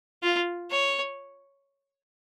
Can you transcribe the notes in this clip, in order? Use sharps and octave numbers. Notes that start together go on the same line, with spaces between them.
F4
C#5